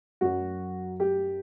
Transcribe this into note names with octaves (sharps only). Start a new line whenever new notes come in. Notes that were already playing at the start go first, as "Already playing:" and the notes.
F#2 F#3 F#4
G4